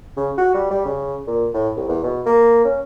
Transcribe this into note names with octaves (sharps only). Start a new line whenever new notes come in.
C#3
F#4
G3
G3
C#3
A#2
A2
C2
E2
B2
A#3
C#4